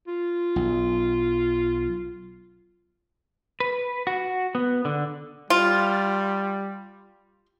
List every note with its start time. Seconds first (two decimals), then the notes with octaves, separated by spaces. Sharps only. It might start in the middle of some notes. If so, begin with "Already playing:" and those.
0.07 F4
0.56 B1
3.60 B4
4.07 F#4
4.55 B3
4.85 D3
5.50 G3 F4